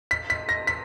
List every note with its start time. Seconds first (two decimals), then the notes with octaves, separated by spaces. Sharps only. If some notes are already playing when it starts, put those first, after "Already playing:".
0.11 B6
0.30 B6
0.49 A#6
0.67 B6